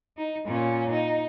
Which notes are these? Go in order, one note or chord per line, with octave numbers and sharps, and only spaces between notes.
D#4
A#2 C#4
D#4